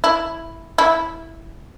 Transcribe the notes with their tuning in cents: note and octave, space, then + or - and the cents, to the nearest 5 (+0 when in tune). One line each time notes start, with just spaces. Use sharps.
E4 +0
E4 -5